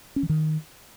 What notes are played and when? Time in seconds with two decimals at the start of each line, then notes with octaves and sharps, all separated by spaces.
0.16 C#4
0.23 E3
0.29 D#3